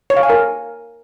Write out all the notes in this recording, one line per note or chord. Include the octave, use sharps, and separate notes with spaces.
C#5
F5
G#5
A#4